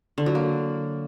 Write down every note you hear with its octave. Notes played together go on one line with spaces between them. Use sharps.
D3
F#3
A#3